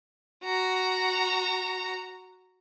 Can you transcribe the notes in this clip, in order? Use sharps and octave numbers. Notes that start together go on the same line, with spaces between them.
F#4 A#5